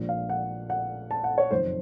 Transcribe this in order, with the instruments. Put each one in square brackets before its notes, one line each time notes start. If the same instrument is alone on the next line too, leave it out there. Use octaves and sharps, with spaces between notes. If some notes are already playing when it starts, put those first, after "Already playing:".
Already playing: [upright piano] A#1 A#2 F3
F5
F#5
F#5
A5
F#5
C#5
F#1 F2 D#3 C5